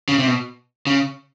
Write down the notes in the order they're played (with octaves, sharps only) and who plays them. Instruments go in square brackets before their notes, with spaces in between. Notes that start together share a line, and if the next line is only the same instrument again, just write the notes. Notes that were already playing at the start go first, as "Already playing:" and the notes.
[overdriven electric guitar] C#3
C3
B2
C#3